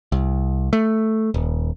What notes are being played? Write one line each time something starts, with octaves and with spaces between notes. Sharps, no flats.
C2
A3
D#1